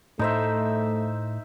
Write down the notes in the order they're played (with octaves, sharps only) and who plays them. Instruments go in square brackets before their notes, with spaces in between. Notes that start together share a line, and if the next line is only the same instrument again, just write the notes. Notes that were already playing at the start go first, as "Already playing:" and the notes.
[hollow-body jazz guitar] A2 [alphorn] A3 [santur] D#4 C5 E5